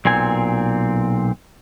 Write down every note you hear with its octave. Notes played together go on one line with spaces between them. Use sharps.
B1 A#2 C4 G#5